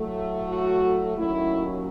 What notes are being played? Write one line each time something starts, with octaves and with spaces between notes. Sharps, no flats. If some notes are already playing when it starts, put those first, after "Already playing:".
Already playing: A2 F#3 A3
F#4
D#2 D#3 F#3 C#4 E4